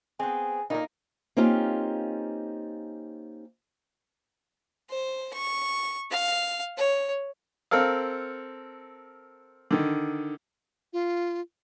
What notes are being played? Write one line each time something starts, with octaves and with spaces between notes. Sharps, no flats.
B3 C4 G#4
A#2 A#3 D#4
A#3 C4 C#4 D#4 F4 G4
C5
C#6
F5
C#5
C4 A4 A#4 F5
D3 D#3
F4